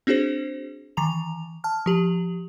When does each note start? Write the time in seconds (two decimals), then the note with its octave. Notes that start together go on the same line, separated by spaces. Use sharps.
0.07 C4 D4 F#4 G#4 C5
0.97 D#3 E3 A#5 F7
1.64 A5 F6
1.86 F3 G4 F#7